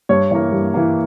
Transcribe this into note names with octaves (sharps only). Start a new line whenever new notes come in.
G2 C#5
E3 A#3 C#5
G2
E3 A#3